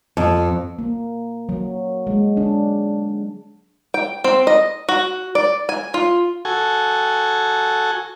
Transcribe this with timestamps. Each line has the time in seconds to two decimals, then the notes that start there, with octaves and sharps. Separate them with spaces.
0.17 F2
0.79 A#3
1.49 F#3
2.07 G#3
2.37 D4
3.94 G5
4.24 C4
4.47 D#5
4.89 F#4
5.35 D5
5.69 G#5
5.94 F4
6.45 F#4 A4 G#5